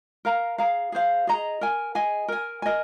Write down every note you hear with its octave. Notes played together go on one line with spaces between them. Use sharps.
A#4 F5 A#5
G#4 F5 A#5
G#4 C5 F5
G#4 D#5 A#5
A#4 G#5
G#4 D#5 G#5
A#4 G#5
A#4 D#5 G#5